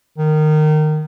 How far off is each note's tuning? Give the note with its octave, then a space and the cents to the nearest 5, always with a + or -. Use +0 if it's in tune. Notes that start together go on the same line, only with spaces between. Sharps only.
D#3 -20